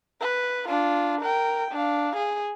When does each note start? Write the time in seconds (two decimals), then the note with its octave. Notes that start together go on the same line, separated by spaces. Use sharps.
0.21 B4
0.67 D4 F4
1.22 A#4 G5
1.72 D4 F5
2.17 G#4